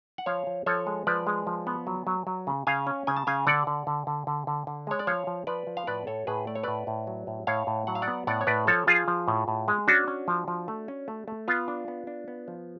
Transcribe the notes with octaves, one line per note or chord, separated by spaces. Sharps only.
F#5
F3 C#5 F5
F3
F3 A4 C#5
G#3
F3 B4 D5
G#3
F3
B3
F#3
F#3
F#3
C#3
C#3 F5 G#5
C#4
C#3 G#5
A5
C#3 F5 G#5
D3 D5 F#5
D3
D3
D3
D3
D3
D3
G#3 C#5
D5
F3 C#5 F5
F3
F3 B4 D5
F3
F5
A2 B4 D5
A2 A4 C#5
A2 G#4 B4
A3 D5
C#5
A2 B4 D5
A2
F#3
A2
A2 C#5 F5
A2
F#3 F#5
F5
D5 F#5
B3
A2 D5 F#5
C#5
A2 B4 D5
F3 A4 C#5
F3 F4 G#4
F3
A2
A2
G#3
C#4 D4 F#4
C#4
F3
F3
A3
C#4
A3
A3
B3 F4
D4
B3
D4
B3
F3